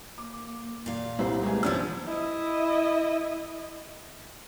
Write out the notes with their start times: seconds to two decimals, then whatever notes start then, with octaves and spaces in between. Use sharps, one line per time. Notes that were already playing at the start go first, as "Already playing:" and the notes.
0.18 A#3 D6
0.86 A#2 F5
1.19 C2 C4 E4 C5
1.43 G#3 A#3 B3 G#4
1.63 F3 B3 C#4 D4 C5 E6
2.07 E4 D#5